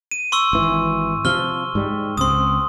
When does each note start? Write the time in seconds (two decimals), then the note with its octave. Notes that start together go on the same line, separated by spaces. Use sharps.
0.11 D#7
0.32 C6 C#6 E6
0.53 G#1 E3
1.25 C3 F3 F6 G7
1.75 G#2 G3
2.18 C#2 C4 C6 D#6